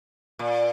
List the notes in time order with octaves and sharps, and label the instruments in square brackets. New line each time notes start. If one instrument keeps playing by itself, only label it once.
[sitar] A#2